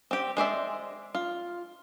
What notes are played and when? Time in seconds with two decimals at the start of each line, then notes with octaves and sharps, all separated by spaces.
0.11 C4 G4
0.37 G#3 C5 D5 E5
1.15 F4